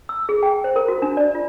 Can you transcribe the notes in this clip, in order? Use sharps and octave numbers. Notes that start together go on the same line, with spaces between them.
E6
G#4
G5
C5
A#4
F#4
D4
D5
F4